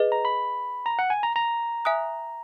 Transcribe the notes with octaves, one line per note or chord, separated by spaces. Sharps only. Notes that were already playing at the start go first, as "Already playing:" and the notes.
Already playing: G#4 B4 D#5
A#5
B5
A#5
F#5
G#5
A#5
A#5
E5 G#5 D#6 F#6